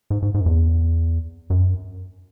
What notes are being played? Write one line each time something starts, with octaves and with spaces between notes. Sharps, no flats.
G#2
G#2
G#2
F#2
E2
F#2